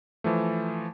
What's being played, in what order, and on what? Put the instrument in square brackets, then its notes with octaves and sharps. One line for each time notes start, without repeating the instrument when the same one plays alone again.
[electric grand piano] E3 F3 A3